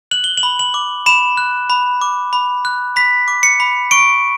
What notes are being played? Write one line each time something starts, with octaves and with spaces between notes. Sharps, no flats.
F#6 F#7
G7
F#7
B5
F#7
D6
B5 E7
F#6
B5
D6
B5
F#6
B5 B6
D6
C#7
B5
C#6 D7